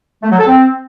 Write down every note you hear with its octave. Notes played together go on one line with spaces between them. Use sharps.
A3
F#3
A4
C4